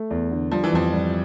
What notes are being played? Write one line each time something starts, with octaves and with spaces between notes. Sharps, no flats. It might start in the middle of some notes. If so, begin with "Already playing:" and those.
Already playing: A3
E2
D3
F3 G3
E3
F2 F3
G3